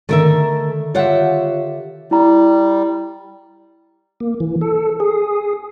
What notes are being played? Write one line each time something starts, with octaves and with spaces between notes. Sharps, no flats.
D3 D#3 A3 A#4 E5
F4 G4 C#5 E5 F#5
G3 E4 A#5
A#3
E3
A4
G#4